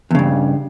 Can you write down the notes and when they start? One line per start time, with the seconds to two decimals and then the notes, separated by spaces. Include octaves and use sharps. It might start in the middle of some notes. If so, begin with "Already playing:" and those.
0.11 E2
0.15 C#3
0.19 G2